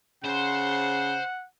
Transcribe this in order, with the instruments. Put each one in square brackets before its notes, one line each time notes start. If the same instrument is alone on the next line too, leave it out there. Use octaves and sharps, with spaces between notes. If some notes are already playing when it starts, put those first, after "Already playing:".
[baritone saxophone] C#3 [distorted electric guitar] C5 C6 [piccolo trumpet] F#5